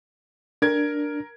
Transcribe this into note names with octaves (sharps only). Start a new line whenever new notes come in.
D4 A#4 G#6